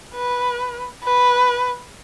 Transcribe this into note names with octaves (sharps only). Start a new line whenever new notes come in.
B4
B4